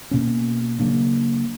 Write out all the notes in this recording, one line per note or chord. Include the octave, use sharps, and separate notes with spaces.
B2 A#3 C#4
C#3 F#3 A#3 D4